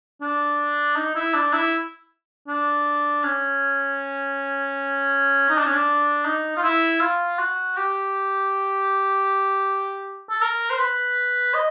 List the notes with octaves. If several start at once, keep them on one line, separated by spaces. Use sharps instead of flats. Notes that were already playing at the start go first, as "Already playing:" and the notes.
D4
D#4
E4
D4
E4
D4
C#4
D#4
D4
C#4
D4
D#4
F4
E4
F4
F#4
G4
A4
A#4
C5
B4
D#5